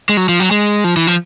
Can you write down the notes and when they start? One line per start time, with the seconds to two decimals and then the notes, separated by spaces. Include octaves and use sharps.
0.09 G#3
0.17 F#3
0.29 F3
0.40 F#3
0.51 G#3
0.84 F3
0.97 E3
1.07 F3